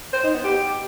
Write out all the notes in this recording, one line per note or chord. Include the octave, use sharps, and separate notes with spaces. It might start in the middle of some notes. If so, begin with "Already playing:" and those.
C5
D#4
B3
G4